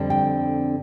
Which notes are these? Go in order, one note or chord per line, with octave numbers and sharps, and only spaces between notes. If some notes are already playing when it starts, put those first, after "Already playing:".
Already playing: F2 D3 G3 C4
G5